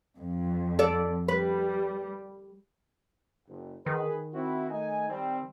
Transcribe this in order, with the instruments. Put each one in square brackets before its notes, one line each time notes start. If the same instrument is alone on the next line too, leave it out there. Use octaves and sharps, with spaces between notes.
[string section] F2
[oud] A4 D5
[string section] G3 [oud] B4
[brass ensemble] F#1
[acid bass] D#3 [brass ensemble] G#4 B4
[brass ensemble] C4 E4 F#4
A3 D#4 G#5
G3 C4